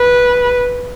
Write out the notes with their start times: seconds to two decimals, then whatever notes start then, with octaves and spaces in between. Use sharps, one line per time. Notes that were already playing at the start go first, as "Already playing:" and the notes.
Already playing: B4